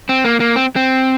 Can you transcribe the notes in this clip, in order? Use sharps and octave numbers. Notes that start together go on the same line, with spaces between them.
C4
A#3
A#3
C4
C4